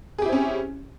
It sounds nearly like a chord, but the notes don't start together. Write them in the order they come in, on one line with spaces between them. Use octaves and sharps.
G#4 G4 E4 C4 C#4